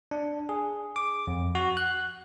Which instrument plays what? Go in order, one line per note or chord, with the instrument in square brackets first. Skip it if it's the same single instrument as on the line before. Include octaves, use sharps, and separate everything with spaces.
[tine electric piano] D4
G#4
D6
F2
F#4
F#6